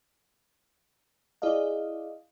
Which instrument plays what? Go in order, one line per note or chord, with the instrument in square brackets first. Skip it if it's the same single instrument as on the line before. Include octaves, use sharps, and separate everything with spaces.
[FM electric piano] E4 G#4 D5 D#5 F5